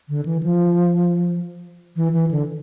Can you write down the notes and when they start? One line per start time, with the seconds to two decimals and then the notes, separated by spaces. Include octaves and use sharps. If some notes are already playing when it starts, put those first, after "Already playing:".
0.09 D3
0.25 E3
0.43 F3
1.96 E3
2.13 E3
2.31 D3